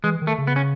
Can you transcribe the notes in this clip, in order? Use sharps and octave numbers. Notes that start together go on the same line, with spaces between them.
E3 G#3
D#3
A3
C#3
B3
C#4